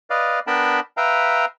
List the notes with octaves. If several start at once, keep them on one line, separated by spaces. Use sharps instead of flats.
B4 D5 D#5 F5
B3 D4 A#4 G5 A5 B5
B4 E5 F5 G5 A#5